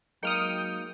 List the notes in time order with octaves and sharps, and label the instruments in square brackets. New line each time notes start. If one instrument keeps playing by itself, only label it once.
[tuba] F#3 [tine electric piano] G#3 A#3 D#4 [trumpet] G5 [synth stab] D#6 F6 C#7